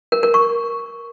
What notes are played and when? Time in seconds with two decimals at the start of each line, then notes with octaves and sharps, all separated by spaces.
0.12 A#4
0.23 A#4
0.34 C#6